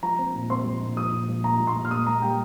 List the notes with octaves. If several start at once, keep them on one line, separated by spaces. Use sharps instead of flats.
F3 A#5
C4
A#2
C4 C6
F3
A#2
F3 D#6
A#2
F3
A#2 A#5
A#2
C6
A#2
F6
A#3 D#6
A#3 A#5
G3 G5